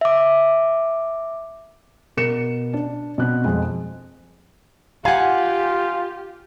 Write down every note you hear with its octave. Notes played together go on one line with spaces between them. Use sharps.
E5 D6
B2 A#4 C#7 E7
D4
B2 C4 F#6
F2 G#3
F4 G4 F5 F#5 G#5